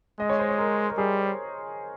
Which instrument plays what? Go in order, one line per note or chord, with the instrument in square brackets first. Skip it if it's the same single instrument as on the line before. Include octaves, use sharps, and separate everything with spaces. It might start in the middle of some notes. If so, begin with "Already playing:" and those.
[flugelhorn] G#3 [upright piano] D#5
[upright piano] C#5
C5
C#5
A#4
A#4
[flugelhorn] G3 [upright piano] G#4